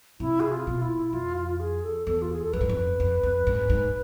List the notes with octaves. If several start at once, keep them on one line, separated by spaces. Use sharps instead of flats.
C3 E4
G#4
F4
B2
E4
F2 F4
F4
F4
G#4
A4
E2 A4
F4
G#4
A4
F2 B4
G#2
F2
F2
F2
G#2
G#2